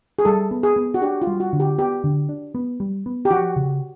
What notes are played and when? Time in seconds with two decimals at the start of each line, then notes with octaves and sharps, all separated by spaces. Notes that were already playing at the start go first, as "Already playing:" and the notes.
0.19 G#4
0.25 G3 A4
0.51 B3
0.63 G#4
0.76 B3
0.94 F#4
1.02 D4 G4
1.22 F4
1.27 G3
1.40 F#4
1.53 D3
1.60 G4
1.78 B3 G4
2.04 D3
2.29 D4
2.55 B3
2.80 G3
3.06 B3
3.25 G4
3.31 F3 F#4
3.56 C#3